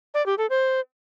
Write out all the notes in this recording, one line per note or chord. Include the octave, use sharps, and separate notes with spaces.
D5
G4
A4
C5